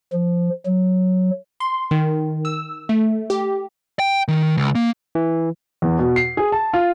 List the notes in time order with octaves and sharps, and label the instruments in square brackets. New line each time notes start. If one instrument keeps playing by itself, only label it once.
[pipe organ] F3
F#3
[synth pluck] C6
D#3
E6
A3
G4
[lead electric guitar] G5
D#3
C#2
A#3
[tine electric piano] E3
[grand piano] E2
B2
C7
G#4
A5
F4